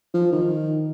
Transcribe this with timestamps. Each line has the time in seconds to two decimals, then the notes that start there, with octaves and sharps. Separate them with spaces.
0.14 F3
0.33 D#3